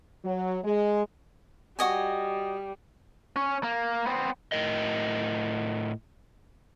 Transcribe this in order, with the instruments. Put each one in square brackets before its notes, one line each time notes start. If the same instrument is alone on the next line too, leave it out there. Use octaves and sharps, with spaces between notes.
[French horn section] F#3
G#3
[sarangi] G3 [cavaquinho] F#4 D#5 G#5
[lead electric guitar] C#4
A#3
B3 C4
[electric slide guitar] A2 A#4 D#5